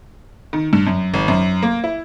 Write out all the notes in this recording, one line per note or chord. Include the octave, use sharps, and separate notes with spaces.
D#3
G2
F#2
G#1
F#2
A#3
E4